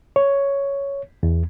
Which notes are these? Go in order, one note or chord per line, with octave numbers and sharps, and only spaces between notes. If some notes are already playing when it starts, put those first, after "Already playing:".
C#5
E2